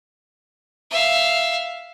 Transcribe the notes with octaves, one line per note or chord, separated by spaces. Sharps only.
E5 F5